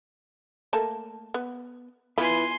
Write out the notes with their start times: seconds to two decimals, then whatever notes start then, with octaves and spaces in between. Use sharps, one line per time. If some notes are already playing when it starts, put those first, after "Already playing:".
0.73 A3 A#3 A5
1.34 B3
2.18 B3 E4 F4 B4 G#5 C6